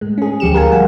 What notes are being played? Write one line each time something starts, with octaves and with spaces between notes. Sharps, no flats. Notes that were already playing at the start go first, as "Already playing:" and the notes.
A2 G#3
C#4 G#4
D2 F3 G4 C#7 E7
A#4 F5 G#5
G3 F#5